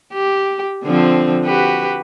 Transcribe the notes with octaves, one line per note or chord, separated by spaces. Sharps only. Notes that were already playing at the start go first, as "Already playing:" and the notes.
G4
D3 F3 C4
F#4 G4 B4